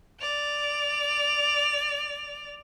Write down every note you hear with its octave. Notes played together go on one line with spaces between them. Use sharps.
D5 F7